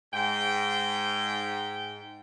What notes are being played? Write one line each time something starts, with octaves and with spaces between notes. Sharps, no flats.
G#2 G5